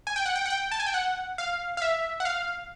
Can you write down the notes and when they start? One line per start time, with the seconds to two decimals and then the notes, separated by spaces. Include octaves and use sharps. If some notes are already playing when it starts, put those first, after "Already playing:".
0.07 G#5
0.16 G5
0.26 F#5
0.36 G5
0.46 F#5
0.50 G5
0.72 A5
0.80 G#5
0.86 G5
0.94 F#5
1.38 F5
1.77 F5
1.82 E5
2.20 F#5
2.25 F5